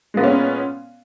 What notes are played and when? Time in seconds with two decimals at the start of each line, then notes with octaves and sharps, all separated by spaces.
0.14 G#3
0.17 B3
0.20 A#2
0.24 C#4